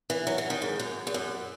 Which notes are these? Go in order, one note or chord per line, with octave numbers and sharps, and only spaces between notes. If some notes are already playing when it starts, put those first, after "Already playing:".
E3
F#3
E3
D#3
G#2
F#2
E2
F#2